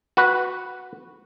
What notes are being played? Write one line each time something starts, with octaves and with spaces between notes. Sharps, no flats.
F#4 B4